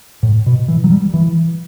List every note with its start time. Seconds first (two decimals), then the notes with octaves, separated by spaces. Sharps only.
0.23 A2
0.46 B2
0.68 E3
0.84 F#3
0.90 G3
1.14 E3